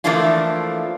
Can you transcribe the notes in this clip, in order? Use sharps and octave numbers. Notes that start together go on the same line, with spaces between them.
E3 F3 A3 A#3 D4 F4